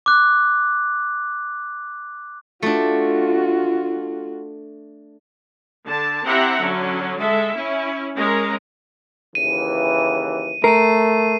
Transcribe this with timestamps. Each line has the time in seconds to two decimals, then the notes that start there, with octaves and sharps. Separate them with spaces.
0.06 D6 F#6
2.62 A3 D4 F4 F#4
5.84 D3 A5
6.26 C4 E4 G4 E5 F#5 A#5
6.59 D3 F#3 C#4
7.19 G#3 A4 E5
7.55 C#4 E4
8.15 G#3 C#4 A#4 A#5
9.35 D#2 C#3 E3 D#7
10.64 A3 A#4 C7 D#7